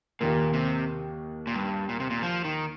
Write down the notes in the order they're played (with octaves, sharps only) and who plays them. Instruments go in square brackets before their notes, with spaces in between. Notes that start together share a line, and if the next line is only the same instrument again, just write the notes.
[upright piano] D#2 D#3 A#3 [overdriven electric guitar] A#2
[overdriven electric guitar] C3
A#2
G2
A#2
C3
A#2
F3
D#3